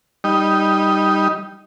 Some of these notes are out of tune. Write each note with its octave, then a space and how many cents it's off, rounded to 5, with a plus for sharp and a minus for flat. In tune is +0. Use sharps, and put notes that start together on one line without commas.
G3 +0 D#4 +0